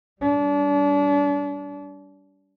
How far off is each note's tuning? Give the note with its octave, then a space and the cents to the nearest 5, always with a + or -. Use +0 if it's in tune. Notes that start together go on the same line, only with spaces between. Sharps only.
G3 -10 D4 -35